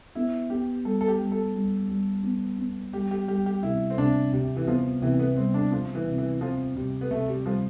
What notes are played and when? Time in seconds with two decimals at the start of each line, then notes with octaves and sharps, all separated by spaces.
0.15 B3 E4
0.50 B3 G4
0.85 G3 A4
1.01 A4
1.08 G4
1.20 G3
1.32 A4
1.55 G3
1.89 G3
2.23 B3
2.58 B3
2.93 G3 G4
3.11 G4
3.28 G3 G4
3.46 G4
3.63 C3 E4
3.90 C4
3.98 C3 D4
4.33 C3 G3
4.56 E3
4.67 F3 B3
5.02 C3 E3
5.19 B3
5.37 G3 C4
5.54 D4
5.71 F3 C4
5.95 E3
6.06 C3
6.18 E3
6.41 F3 C4
6.76 C3 G3
7.01 B3
7.11 C3 A3
7.28 G3
7.46 F3 G3